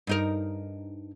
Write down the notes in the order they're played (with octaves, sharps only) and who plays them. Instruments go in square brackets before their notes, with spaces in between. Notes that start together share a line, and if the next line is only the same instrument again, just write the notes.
[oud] G2 D#4 A#4